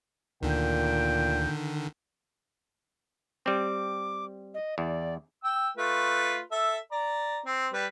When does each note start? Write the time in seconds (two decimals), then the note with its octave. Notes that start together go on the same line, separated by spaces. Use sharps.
0.43 D2 A#2 D3 D#3 G5
3.46 G3 C4 D6
4.54 D#5
4.78 E2 D5
5.44 G5 E6
5.77 A3 F4 B4
6.51 A4 E5
6.92 D5 A#5
7.46 C4
7.73 G3 B4